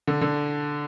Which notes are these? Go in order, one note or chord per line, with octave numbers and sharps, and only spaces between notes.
D3
D3